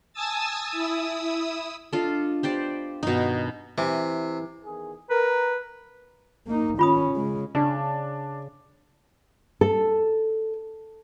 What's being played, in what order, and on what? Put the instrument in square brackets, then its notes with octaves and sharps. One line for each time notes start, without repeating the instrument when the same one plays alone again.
[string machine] G#5 A5 D#6 E6 A6
E4 D#6 E6
[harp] D4 D#5 F5 [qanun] F4 A4
[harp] B3 [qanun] G4 C5 D5
[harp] G2 D#3 [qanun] B2 D#4
[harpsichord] C3 [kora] E3
[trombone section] E2 D#3 G#4
[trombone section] A#4 [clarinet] B4
[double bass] A#3 D#4
[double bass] D#3 C#4 [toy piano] F4 B5 D#6
[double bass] C#3 G#3
[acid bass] C#3 [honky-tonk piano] D4
[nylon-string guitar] A4